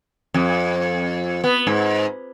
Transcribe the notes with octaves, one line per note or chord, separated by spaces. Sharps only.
F2
B3
G#2